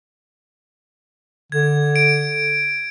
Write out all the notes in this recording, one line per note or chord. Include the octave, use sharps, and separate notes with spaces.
D3 G#6
D7